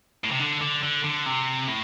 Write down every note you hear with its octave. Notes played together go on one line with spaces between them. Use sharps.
A2
C3
D3
D3
D3
D3
C3
A2